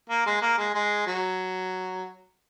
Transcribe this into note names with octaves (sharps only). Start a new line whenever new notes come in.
A#3
G#3
A#3
G#3
G#3
F#3